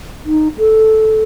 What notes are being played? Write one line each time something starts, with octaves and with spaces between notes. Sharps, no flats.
D#4
A4